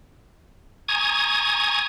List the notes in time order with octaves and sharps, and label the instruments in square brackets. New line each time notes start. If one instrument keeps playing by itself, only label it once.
[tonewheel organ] G#5 A#5 C#6 D#6 G#6